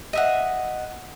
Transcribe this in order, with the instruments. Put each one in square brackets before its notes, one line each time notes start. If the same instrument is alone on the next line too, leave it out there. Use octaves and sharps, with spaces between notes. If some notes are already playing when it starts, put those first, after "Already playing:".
[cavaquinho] D#5 E5 F#5